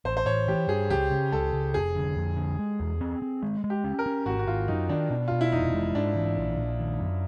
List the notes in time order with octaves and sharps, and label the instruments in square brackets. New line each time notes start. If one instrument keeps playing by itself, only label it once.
[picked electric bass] A1 [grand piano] C5
[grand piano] C5
[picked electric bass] A1 [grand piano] C#5
[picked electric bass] E3 [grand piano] G4
[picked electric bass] G2 [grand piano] G#4
[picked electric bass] C#2 [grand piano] G4
[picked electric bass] C#3
[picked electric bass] C#2 [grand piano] A4
[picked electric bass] C#2
[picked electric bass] F1 [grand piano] G#4
[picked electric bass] D3
F2
D3
G#3
E2
C4
C4
G#3
G#3
[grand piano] G4
[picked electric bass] C#4
[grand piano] A#4
[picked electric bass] C#4
[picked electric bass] G#1 [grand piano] F#4
[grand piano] F#4
[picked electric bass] G#1 [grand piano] F4
[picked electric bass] F#2 [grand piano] D#4
[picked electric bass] D#3 [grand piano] D4
[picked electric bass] B2 [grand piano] D4
[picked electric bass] B2 [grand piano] F4
[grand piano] E4
[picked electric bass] F1 [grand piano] D#4
[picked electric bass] G#3
[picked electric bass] G#2 [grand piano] D4
[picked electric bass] E3
A#1
A#1
D#3
F#2